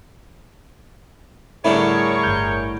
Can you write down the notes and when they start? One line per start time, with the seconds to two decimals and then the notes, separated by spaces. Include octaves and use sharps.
1.65 A2 D3 G3 E4 G#4 A#4 C#5
2.23 G1 G6